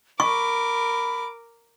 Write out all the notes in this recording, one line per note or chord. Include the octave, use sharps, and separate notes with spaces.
A#4 B5 C#6 D6